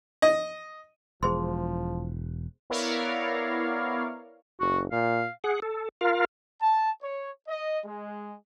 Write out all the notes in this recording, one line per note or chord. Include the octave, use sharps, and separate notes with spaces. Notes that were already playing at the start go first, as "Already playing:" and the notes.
D#5
E1 F3 G#4 C5 C6
B3 E4 A#4 C#5 D5 F5
F#1 F#4
A#2 F5
G#4 F#5
A4
F4 A#4 F5
A5
C#5
D#5
G#3